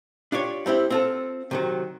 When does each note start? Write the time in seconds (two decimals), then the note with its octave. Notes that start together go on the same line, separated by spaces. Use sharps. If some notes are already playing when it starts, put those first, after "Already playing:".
0.32 D4 F4 G4 C#5
0.66 G3 C4 E4 G4
0.90 C4 F4 A4
1.51 C3 D#3 F#3